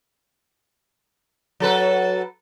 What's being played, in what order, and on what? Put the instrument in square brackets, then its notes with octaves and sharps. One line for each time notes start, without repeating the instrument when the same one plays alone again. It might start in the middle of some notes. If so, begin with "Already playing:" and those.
[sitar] F#3 A4 B4